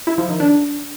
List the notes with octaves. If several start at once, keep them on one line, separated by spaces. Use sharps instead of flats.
E4
F3
D#3
D4